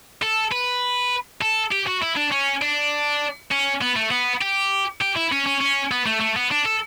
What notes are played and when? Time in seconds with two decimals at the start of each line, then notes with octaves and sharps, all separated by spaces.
0.22 A4
0.52 B4
1.42 A4
1.72 G4
1.87 F#4
2.02 E4
2.17 D4
2.32 C#4
2.62 D4
3.51 C#4
3.82 B3
3.96 A3
4.11 B3
4.41 G4
5.01 G4
5.16 E4
5.32 C#4
5.46 C#4
5.61 C#4
5.92 B3
6.06 A3
6.21 A3
6.36 B3
6.51 D4
6.65 A4